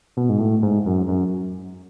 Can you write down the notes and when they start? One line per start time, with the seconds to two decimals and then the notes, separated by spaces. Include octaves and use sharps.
0.17 B2
0.29 G#2
0.39 A2
0.62 G#2
0.86 F#2
1.08 F#2